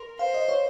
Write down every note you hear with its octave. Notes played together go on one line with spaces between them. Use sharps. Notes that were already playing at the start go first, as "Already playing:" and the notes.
Already playing: A#4 C6
C5 F5
D#5
C#5